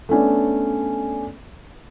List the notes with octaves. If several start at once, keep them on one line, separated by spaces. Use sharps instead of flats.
A3 B3 C#4 D4